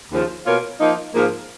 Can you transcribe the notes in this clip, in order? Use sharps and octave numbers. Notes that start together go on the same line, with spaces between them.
D#2 C#3 F3
B2 A#3 F4 A#4 C#5
F3 A#3 D#4
G#2 F3 A#3